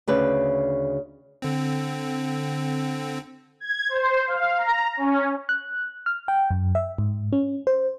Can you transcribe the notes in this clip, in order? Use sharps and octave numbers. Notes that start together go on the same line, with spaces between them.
D2 C#3 B4
D3 C4
G#6
C5
F5
A#5
C#4
F#6
F6
G5
F#2
E5
G#2
C#4
C5